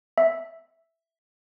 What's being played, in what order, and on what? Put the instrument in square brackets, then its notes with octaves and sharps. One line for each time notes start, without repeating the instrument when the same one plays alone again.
[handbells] E5